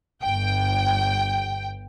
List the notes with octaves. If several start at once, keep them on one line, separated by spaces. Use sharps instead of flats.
G1 G5